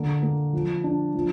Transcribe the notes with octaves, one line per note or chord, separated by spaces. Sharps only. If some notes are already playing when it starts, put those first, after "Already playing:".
Already playing: D3 A#3
A#3
F3
D4
F3